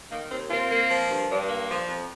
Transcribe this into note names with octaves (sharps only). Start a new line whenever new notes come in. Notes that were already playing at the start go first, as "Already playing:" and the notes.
D#3 A#3
D#2 C4
A#3 C4 F4
A#3
F3
G2
G2
A#3
F3
F2